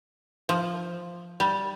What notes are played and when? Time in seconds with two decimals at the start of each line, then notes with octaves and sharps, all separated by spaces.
0.49 F3
1.40 G3